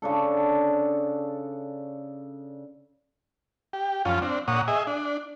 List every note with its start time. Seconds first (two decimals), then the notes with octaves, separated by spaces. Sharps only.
0.02 C#3 D4 A4
3.73 G4
4.05 F#2 F3 C#4 F4
4.22 C4 D4
4.48 A#2 C#5 F#5 D#6
4.68 G#4 D#5 E5
4.87 D4